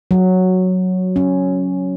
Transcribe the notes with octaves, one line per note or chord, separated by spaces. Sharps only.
F#3
C#4